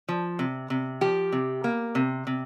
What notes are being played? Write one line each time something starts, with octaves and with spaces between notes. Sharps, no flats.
F3
C3
C3
F3 G4
C3
A#3
C3
C3